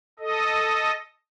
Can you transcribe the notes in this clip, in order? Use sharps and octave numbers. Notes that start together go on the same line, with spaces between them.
A4 D#5